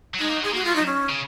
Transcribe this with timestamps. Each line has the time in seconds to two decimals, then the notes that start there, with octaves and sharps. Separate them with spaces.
0.14 F#3
0.20 G#3 D#4
0.29 A#3
0.37 F#3
0.44 G#3 G#4
0.53 A#3 F#4
0.61 G#3 F4
0.70 F#3
0.76 D#4
0.86 C#4
1.10 C#3